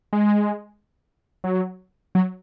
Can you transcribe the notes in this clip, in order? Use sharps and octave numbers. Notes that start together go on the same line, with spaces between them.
G#3
F#3
F#3